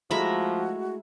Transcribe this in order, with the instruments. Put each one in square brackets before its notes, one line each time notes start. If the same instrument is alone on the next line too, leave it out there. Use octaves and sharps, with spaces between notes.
[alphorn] F3 [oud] G#3 A3 E4 [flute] F#4 [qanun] E5 A#5 B5